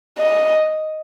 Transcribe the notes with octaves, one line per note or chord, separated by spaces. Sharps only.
D#5